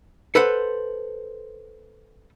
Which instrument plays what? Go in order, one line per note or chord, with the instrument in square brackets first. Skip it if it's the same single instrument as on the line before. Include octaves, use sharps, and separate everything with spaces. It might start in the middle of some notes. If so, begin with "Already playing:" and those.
[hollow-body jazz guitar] A4 B4 C5 F#5